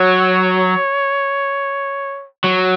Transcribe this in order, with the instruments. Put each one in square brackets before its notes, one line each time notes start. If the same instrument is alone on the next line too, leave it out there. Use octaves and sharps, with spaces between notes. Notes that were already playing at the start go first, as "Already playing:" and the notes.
Already playing: [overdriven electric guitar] F#3 [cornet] C#5
[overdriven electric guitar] F#3